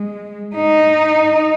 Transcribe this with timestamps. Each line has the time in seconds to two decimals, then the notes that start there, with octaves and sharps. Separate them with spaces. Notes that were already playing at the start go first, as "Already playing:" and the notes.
Already playing: G#3
0.56 D#4